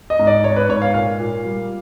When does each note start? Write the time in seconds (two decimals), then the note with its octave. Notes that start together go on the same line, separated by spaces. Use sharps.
0.10 D#5
0.19 G#2
0.27 D5
0.44 G#2 C#5
0.56 B4
0.69 G#2 C#5
0.82 F5
0.94 A#2 F5
1.20 A#2
1.45 G3